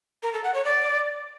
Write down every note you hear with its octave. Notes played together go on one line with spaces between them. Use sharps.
A#4
A4
F#5
C#5
D5